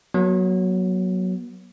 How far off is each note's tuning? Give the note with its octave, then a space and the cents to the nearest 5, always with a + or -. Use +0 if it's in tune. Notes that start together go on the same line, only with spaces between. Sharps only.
F#3 +0 B3 -45